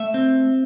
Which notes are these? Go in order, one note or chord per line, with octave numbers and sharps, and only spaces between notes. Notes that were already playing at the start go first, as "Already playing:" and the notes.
Already playing: A3 E5
C4